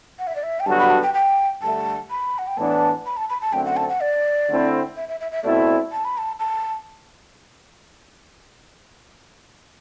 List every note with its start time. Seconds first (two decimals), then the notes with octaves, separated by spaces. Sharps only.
0.19 F#5
0.27 E5
0.36 D5
0.43 E5
0.60 G5
0.66 G2 D3 F#3 B3 F#4 A5
0.79 B5
0.90 A5
1.03 G5
1.14 G5
1.62 G2 D3 A3 A5
2.10 B5
2.39 F#5
2.48 G5
2.57 A2 E3 B3 D4 A5
3.06 B5
3.17 A5
3.30 B5
3.41 A5
3.53 F#2 D3 A3 C4 G5
3.66 F#5
3.77 A5
3.89 F#5
4.01 D5
4.49 D3 A3 C4 E4
4.96 E5
5.09 E5
5.20 E5
5.32 E5
5.44 B2 A3 C4 E4 D5
5.92 A5
6.05 B5
6.18 A5
6.39 A5